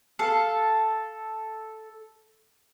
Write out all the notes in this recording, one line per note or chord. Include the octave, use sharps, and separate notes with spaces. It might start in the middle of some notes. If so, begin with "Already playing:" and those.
A4 F5